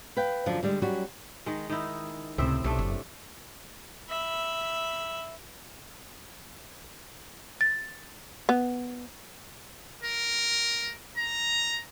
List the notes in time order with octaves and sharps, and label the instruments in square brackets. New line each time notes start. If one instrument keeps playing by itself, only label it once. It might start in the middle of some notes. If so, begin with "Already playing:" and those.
[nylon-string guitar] B4 F5 G5
F#2 D3 F3
D3 G3 G#3
F#3 G3 C#4 F#4
[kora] D#3 G#3
D#3 D#4 E4
[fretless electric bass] C#2 C3 [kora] A2 C4 E5
[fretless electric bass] B1 [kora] C3 A3 D4
[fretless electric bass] F#1
[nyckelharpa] E5 B5
[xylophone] A6
[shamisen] B3
[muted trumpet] A#4
A#5